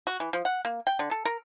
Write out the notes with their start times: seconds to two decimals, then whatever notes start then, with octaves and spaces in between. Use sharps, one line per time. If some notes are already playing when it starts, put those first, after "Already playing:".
0.07 F#4
0.20 E3
0.33 F3
0.45 F#5
0.65 A#3
0.87 G5
0.99 D3
1.11 A4
1.25 A#4